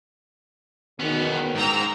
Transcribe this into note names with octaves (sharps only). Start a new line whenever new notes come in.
E2 B2 D#3 B3 C#4
G#2 G5 A#5 E6